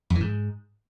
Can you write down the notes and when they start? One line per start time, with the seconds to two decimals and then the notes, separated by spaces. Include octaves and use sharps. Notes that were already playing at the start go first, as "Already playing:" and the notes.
0.10 F2
0.15 E3
0.20 G#2